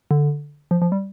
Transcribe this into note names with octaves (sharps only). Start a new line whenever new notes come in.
D3
F3
F3
G3